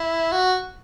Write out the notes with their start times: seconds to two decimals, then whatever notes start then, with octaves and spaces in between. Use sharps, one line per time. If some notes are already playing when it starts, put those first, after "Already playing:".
Already playing: E4
0.32 F#4